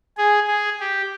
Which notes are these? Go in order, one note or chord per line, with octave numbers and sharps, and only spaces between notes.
G#4
G#4
G4